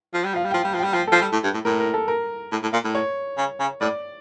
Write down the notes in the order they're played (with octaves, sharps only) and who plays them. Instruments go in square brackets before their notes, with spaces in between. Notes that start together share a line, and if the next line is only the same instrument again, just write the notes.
[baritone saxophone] F3
G3
[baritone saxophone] F3 [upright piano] F5
[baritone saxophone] G3
[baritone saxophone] F3 [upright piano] G5
[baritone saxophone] G3
F3
[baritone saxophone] G3 [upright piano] G5
[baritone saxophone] F3
[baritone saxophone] F3 [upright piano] A4
[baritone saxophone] G3
A2
G2
A2
[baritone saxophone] A2 [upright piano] A#4
[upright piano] A#4
A4
A#4
[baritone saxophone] A2
A2
A#2
A2
[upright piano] C#5
[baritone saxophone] C#3
C#3
[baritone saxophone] A2 [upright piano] D5